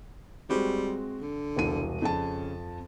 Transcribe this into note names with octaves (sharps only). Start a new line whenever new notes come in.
G3 G#3 C4 F#4
D3
E1 C2 D#7
F2 C#3 A5